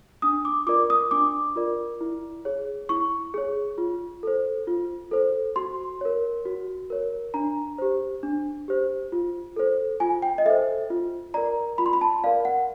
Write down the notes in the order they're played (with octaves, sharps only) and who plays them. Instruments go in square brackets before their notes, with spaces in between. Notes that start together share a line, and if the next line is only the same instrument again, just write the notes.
[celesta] D4 D#6
D6
F4 A#4 D5 D6
D#6
D4 D6
F4 A#4 D5
E4
G#4 C#5
E4 C#6
G#4 C#5
F4
A4 C5
F4
A4 C5
F#4 C6
A#4 C#5
F#4
A#4 C#5
D4 A#5
G4 C5
D4
G4 C5
F4
A4 C5
F4 G#5
G5
D#5
A4 C5 E5
F4
A#4 D5 A#5
F4 B5
C6
B5
A5
A#4 D5 F5
F#5